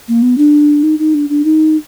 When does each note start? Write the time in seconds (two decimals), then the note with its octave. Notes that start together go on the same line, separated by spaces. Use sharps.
0.08 A#3
0.22 B3
0.38 D4
0.83 D#4
0.99 D#4
1.14 D4
1.29 D4
1.45 D#4